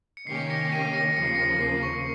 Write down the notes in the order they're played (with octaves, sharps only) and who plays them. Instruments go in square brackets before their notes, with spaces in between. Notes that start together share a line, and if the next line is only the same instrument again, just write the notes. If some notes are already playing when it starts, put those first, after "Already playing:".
[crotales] C#7
[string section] C3 D#3 A#3 C#4 G4 [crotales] C7
[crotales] A#6 C#7
C7 D#7
A#6 C#7
[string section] D#2 C#3 F3 A#3 [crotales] C#7
[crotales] C7
A#6 C#7
C7
C#6